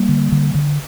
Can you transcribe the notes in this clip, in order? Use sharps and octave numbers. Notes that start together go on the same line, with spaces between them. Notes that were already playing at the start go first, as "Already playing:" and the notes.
Already playing: G3 A#3
D3
D3
D3